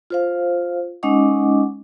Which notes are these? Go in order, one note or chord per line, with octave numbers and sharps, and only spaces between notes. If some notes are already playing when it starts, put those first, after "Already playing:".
F4 C5 F5
G#3 C#4 D#4 D#5 F#5 D6